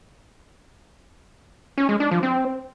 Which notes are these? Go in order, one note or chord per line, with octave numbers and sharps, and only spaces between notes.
C#4
G#3
D4
F3
C4